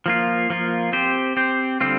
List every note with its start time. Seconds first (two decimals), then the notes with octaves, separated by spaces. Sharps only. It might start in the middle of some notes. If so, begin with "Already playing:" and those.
0.06 F3 A#3 F4
0.50 F3 A#3 F4
0.92 C4 G4 C5
1.37 C4 G4 C5
1.80 D3 G3 C4 F4